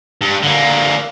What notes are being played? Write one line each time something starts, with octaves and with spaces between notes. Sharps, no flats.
G2
D3 A#3